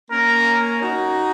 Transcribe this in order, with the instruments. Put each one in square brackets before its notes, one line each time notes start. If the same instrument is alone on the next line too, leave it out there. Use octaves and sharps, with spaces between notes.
[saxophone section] A#3 C#4 [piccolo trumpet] A#4
[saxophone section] D#4 F#4